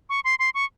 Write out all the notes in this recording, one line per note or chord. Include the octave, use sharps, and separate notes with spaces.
C#6
C6
C6
C#6